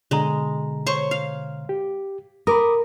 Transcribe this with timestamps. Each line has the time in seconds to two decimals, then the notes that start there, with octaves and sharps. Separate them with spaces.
0.11 B2 D3 G#3 A#5
0.87 C5 C#5 C#6
1.11 F5
1.69 G4
2.47 A#4 B5 D6 D#6